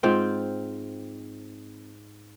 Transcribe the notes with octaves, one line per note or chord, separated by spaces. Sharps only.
G#2 C4 F4 G5